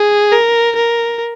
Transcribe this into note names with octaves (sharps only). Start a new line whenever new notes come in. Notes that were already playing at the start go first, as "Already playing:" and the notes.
Already playing: G#4
A#4
A#4